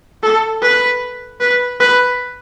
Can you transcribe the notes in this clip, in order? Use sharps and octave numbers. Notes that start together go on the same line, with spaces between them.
A4
B4
B4
B4